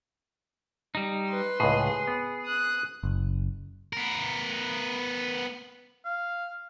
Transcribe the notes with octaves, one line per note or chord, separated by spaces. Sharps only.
G3 D#4
B4 C6
C#2 A2 G#4
B3
D#6 F#6
F#1
B3 A#4
F5